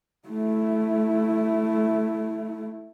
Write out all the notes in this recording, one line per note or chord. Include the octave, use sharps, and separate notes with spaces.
A3 E4